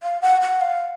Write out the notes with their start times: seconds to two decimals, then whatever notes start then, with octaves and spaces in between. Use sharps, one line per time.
0.03 F5
0.22 F#5
0.41 F#5
0.61 F5